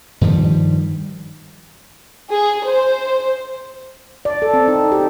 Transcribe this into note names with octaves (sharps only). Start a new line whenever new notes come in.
G2 D#3 F3 G3
G#4
C5
D5
A4
C4
D#4
G4